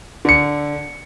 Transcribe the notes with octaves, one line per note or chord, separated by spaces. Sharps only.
D3 C#7